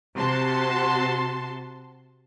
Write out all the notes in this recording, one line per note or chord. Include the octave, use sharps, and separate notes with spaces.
C3 F#4 A5 C6